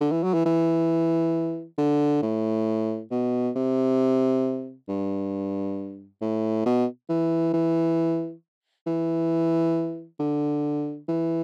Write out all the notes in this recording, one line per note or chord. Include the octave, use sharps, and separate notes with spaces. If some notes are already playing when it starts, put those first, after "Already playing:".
D3
E3
F#3
E3
E3
D3
A2
B2
C3
G2
A2
B2
E3
E3
E3
D3
E3